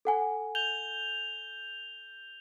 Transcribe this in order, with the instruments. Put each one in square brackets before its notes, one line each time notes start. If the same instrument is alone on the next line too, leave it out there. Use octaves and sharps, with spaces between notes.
[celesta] A4 F#5 G#5
[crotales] G6 F7 G7